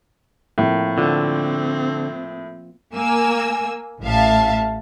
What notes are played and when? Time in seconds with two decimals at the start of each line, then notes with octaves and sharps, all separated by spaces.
0.58 A2 F3 A#3 C4
0.98 D3 C4 F4
2.95 A#3 G#5 E6
4.02 A1 A2 E5 F5 A5